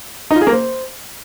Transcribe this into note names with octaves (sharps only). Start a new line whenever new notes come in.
D#4
F4
G#4
A#3
C5